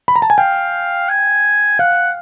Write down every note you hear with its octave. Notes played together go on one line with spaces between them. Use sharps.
B5
A#5
A5
G#5
F5 G5
G#5
F5 F#5